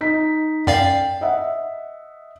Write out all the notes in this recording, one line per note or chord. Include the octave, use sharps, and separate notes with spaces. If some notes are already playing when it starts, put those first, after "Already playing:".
D#4 B6
F#2 D5 F5 G5
D#5 E5 F#5